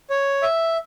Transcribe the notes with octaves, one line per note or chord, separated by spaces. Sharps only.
C#5
E5